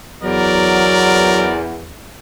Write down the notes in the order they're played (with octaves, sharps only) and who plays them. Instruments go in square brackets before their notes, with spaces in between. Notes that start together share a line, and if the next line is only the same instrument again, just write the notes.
[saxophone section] E2 [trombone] F#3 [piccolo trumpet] A#4 [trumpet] D5